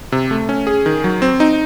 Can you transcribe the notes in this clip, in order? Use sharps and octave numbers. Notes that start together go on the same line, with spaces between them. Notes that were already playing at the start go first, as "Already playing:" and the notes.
C3
A3
C#4
G#4
D#3
F#3
C4
D#4